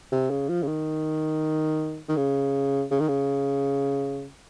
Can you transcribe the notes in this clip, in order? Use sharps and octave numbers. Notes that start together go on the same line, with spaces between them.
C3
C#3
F3
C#3
D#3
D#3
C#3
C#3
D#3
C#3